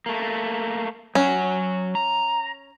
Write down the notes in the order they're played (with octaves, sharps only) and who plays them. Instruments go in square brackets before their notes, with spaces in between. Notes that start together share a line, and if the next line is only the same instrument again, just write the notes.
[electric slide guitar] A3 A#3
[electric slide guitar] F#3 F#5 [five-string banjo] C#4
[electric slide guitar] A#5